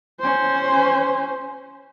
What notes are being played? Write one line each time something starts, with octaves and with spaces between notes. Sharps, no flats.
C#4 C5